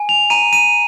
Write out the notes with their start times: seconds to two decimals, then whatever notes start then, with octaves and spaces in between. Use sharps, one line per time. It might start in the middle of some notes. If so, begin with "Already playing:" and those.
Already playing: G#5
0.09 F7
0.30 A#5 D#7
0.53 D#7